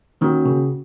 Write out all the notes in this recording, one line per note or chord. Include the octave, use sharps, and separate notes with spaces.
D#3 A#3 C#4 F#4
C#3